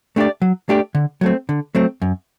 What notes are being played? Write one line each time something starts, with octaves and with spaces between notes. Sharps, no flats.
A3 D4 G4 D5
F#3
A3 D4 G4 D5
D3
F#3 A3 C4
D3
F#3 A3 C4
F#2